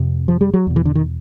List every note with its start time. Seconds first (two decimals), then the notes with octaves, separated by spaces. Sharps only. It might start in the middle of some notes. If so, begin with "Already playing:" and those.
Already playing: F2 C3
0.28 F3
0.41 G3
0.54 F#3
0.67 E2 B2
0.76 E3
0.85 D3
0.95 D#3